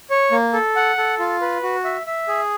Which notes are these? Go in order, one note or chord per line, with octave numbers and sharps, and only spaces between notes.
C#5
A#3
A4
F#5
A4
F4
B4
F#4
E5
E5
G#4